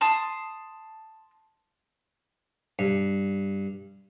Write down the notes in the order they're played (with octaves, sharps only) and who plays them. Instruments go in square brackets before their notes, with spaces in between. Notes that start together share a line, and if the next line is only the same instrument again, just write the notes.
[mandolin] A5 C6 D#6
[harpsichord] G2